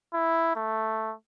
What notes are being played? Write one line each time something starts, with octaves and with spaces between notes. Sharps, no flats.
E4
A3